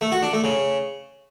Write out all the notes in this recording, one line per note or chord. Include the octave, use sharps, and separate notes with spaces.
A3
F#4
D4
A3
C#3